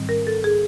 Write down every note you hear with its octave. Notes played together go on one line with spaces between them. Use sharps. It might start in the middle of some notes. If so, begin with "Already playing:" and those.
Already playing: G#2 D#3 G3 C4
A#4
A4
G#4